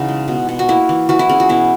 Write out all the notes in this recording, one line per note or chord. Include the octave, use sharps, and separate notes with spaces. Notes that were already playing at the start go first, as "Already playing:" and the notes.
Already playing: C#3 E3 D#4 F#4
G#3
B2
B2
F#4
A#3 E4
E3
E3 F#4
E4
C#4 G#4
F#4
B2 E4